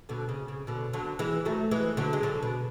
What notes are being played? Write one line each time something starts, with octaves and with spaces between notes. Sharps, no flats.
B2 D3
C#3
C#3
B2 D3
D3 F#3
E3 G#3
F#3 A3
E3 G#3
D3 F#3
G#3
D3 F#3
B2